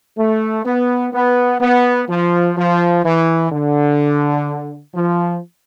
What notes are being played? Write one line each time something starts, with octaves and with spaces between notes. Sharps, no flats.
A3
B3
B3
B3
F3
F3
E3
D3
F3